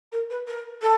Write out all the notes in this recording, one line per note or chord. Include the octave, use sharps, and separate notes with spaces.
A#4
B4
A#4
A4